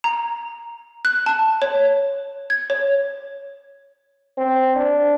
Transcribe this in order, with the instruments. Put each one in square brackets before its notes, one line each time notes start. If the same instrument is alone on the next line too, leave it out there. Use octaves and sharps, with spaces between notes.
[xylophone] A#5
F#6
A5
C#5
G#6
C#5
[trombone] C4
D4